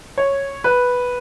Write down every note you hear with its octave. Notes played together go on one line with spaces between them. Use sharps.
C#5
B4